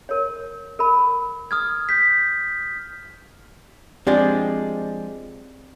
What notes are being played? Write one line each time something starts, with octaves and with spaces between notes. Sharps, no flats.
A#4 C#5
A#4 B5
D#6 F6 G#6
G6 B6
F3 G#3 C4 D4 G4 D5